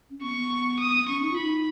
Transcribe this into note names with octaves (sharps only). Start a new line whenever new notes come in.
C#4
B3 C#6
B3
D#6
C#4 C#6
D#4
F4
D#4 B5